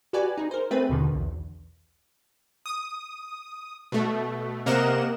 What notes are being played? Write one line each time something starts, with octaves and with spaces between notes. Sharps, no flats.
F#4 G4 B4 D5 G#5
D#4 G#4
A#4 C5
A3 C4 G#4 B4 D#7
D#2 B2 D3 D#3
B1 E2
D#6
B2 A3
C3 A#3 A#4 D#5 F#5 E7